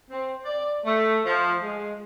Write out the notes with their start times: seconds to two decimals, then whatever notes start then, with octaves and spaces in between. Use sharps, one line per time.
0.11 C4
0.45 D5
0.85 A3
1.26 F3
1.63 G#3